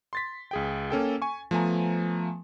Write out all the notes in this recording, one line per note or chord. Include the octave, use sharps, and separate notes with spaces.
C6 A6 B6
C#2 G#4 G5
A#3 C#4 A4 G5
G#5 C#6
F3 A3 B3 G#5 A#5